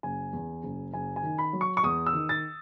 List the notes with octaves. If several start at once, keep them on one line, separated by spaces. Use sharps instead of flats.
F#1 G#5
E2
F#1
F#1 G#5
G#5
D#3
B5
F#3
C#6
C#6
E2 D#6
E6
D#3
A6